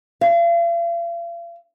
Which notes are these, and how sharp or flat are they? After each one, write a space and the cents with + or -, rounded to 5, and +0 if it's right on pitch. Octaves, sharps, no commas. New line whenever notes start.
F5 -40